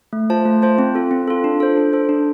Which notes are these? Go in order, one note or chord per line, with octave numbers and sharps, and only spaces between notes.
A3
F4 C5 A5
A3
F4 C5 A5
C4
F4 A4
C4
F4 A4
D4
A4 C5
D4
A4 C5
D4